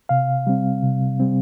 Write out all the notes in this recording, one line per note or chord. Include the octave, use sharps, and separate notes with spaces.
C3 F5
G3 C4
C3
G3 C4